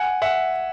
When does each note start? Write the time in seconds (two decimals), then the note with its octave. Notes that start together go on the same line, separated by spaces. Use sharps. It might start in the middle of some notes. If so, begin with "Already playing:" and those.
Already playing: F#5 G#5
0.22 E5 F#5